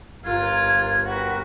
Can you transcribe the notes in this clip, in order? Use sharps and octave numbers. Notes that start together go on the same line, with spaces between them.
G1 F4 A#4 F#6 G#6
F#4 A#4 B4 G5